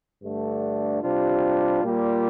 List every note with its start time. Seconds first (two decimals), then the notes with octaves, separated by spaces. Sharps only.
0.23 G2 D3 A3 D4
1.02 C3 G3 D4 F4
1.82 A#2 G3 A#3 F4